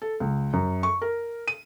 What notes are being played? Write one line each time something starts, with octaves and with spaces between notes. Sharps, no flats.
A4
C#2
F#2
C#6
A#4
D#7